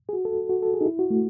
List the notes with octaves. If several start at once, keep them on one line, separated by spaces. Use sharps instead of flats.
G#4
F#4
A4
F#4
A4
G#4
D#4
E4
F#4
A3